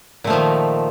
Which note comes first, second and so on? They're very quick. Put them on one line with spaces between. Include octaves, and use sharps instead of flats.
A#2 A3 F3 D#3